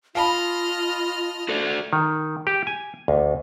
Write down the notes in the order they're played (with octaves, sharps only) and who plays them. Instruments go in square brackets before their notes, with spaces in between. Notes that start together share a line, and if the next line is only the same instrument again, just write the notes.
[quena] F4 [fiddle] D#5 F6 [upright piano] F5 A5 B5
[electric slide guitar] F#4 A4 D5
[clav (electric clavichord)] D#3
G4
G#5
D2